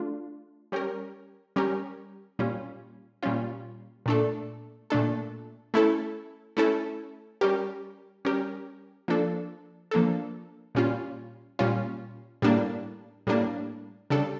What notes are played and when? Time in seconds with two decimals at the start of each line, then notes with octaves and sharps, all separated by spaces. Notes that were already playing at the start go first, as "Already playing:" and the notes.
Already playing: A3 D4 F4
0.72 G3 C#4 G4 A#4
1.56 G3 C#4 G4 A#4
2.39 A#2 G3 C#4 F4
3.23 A#2 G3 C#4 F4
4.06 A#2 A3 D4 A4
4.90 A#2 A3 D4 A4
5.74 A3 C#4 E4 A4
6.57 A3 C#4 E4 A4
7.41 G3 C#4 G4 A#4
8.25 G3 C#4 G4 A#4
9.08 F3 A#3 D4 A4
9.91 F3 A#3 D4 A4
10.75 A#2 G3 C#4 F4
11.59 A#2 G3 C#4 F4
12.42 A2 G3 A#3 D4
13.27 A2 G3 A#3 D4
14.10 C#3 G3 D4 A4